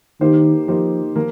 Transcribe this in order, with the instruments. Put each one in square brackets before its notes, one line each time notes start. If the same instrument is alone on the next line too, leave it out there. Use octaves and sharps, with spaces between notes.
[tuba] D#3 [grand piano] A#3 D#4 G4 C5
[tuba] F3 [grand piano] A#3 D#4 G4 C5
[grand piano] F3 A#3 A#4